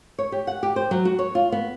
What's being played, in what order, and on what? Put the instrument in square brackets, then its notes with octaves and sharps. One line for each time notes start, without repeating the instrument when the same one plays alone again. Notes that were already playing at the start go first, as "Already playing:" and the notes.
[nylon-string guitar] C#5
G4
F#5
G4
C5
F#3
F#4
C#5
F4
B3